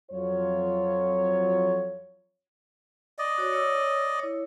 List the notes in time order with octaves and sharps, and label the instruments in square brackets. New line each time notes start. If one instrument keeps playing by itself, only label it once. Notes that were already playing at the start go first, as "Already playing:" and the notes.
[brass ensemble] F2 F#3 F4 C#5
[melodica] D5 D#5
[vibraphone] F#4 C#5
C#5 E6
E4 C#5